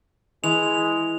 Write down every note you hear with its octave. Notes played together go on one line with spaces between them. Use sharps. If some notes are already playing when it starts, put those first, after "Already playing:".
E3 G#3 F7